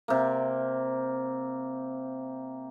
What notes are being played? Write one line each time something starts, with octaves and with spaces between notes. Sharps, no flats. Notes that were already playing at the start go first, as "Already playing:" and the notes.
C3 A#3